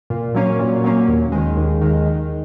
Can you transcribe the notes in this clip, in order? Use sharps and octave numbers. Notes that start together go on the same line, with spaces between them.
A#2
F#3 A#3 C#4
A#2
F#3 A#3 C#4
D#2
D#3 G#3
D#2
D#3 G#3
D#3